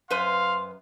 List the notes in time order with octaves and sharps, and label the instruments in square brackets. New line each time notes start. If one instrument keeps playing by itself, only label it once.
[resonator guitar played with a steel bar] F#2 B4 C5 [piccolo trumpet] F5 [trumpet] C6